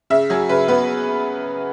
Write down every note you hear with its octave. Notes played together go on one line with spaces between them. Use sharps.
C#3 E5
F#3 G#4
C#3 B4
B3 B4